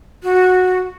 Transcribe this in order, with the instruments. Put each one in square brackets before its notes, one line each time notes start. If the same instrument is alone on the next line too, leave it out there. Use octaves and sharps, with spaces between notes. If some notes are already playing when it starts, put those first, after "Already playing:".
[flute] F#4